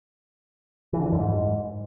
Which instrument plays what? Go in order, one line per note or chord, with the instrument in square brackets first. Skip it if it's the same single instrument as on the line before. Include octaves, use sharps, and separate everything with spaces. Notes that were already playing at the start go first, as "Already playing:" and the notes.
[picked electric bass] E3
D3
E3
F#2
G#2